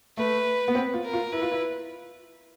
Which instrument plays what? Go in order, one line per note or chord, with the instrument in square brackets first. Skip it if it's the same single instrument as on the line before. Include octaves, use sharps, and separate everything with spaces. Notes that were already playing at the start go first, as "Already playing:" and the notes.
[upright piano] A3 [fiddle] B4
[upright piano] B3
C4
F4
[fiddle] A#4
[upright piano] F4
[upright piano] E4 [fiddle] B4
[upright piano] F4
E4